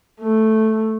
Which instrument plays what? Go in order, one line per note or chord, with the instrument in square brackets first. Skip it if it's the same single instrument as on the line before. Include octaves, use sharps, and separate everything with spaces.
[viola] A3